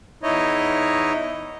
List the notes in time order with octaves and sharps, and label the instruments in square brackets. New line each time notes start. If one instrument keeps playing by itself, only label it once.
[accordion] E2 D#4 E4 C#5 D#5